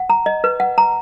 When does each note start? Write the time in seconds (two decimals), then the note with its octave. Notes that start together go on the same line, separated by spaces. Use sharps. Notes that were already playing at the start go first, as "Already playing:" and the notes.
Already playing: F#5
0.09 A#5
0.26 D#5
0.44 B4
0.60 F#5
0.78 A#5